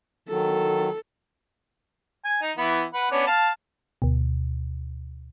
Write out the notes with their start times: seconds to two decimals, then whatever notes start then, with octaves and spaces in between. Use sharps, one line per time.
0.29 D#3 F#3 A4
2.25 G#5
2.42 D#4
2.57 E3 B3 E4
2.94 B4 F#5
3.11 B3 C#4 D4
3.27 F5 A5
4.02 D2 B2